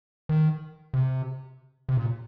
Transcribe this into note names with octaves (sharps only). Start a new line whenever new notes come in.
D#3
C3
C3
A#2